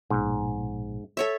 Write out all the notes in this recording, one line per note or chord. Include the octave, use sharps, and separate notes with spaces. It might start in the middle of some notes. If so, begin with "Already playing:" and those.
A#1 G#2 B2
A4 C#5 E5